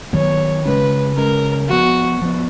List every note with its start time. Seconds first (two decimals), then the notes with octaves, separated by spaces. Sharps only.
0.13 D#3 F#3 B3 C#5
0.65 C#3 G#3 C#4 B4
1.17 C#3 G#3 C#4 A#4
1.69 F3 B3 F#4
2.22 F3 B3